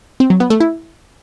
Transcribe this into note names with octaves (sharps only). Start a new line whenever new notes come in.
C4
F#3
B3
A3
E4